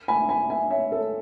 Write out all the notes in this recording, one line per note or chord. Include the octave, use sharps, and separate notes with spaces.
G#5 B5
G#5 B5
E5 G#5
C#5 E5
A4 C#5